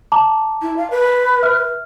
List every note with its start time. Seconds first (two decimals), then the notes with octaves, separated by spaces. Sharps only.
0.12 A5 A#5 D6
0.62 E4
0.77 F5
0.91 B4
1.42 E5 F6